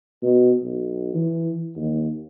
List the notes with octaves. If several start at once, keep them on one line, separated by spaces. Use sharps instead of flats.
B2
B1
E3
D#2